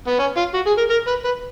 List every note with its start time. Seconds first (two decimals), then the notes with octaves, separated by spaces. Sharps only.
0.07 B3
0.19 C#4
0.37 F4
0.54 F#4
0.66 G#4
0.78 A#4
0.90 A#4
1.07 B4
1.24 B4